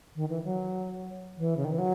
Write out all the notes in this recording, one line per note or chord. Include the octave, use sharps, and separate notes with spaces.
D#3
E3
F#3
E3
C#3
D#3
E3
F#3